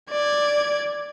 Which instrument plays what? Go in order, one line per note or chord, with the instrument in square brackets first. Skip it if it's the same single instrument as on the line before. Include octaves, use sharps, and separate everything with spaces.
[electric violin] D5 G#6